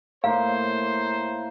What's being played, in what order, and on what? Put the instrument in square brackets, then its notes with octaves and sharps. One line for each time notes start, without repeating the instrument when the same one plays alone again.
[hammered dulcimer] A2 A#3 [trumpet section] C5 [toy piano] F5